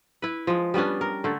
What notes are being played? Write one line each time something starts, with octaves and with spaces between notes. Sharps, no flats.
E4 B4
F3 G#3
G3 B3 C#4 D4
A#4
D3 A3